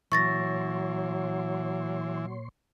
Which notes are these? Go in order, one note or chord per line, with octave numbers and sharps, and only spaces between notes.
A#2 E3 F#3 C#5 C6 C#6 A6 A#6